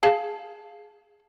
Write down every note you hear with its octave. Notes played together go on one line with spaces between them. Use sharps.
G#4 F5 A5